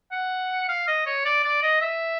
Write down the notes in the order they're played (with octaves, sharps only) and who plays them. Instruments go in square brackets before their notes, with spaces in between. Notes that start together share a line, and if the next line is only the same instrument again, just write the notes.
[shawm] F#5
F5
D#5
C#5
D5
D5
D#5
E5